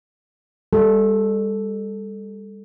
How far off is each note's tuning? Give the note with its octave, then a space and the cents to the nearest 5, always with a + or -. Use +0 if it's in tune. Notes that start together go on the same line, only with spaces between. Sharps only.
G3 +35 A4 +0